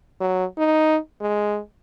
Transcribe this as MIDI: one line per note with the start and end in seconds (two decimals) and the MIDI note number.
0.21 0.45 54
0.58 0.97 63
1.21 1.58 56